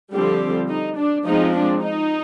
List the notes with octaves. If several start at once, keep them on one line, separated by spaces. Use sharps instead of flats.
D3 F3 G3 C4 G4
D#4
D4
F3 G#3 C4 D#4
D4
D#4